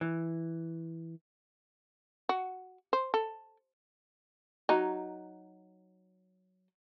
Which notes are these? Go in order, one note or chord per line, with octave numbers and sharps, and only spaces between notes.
E3
F#4
C5
A4
F#3 D#4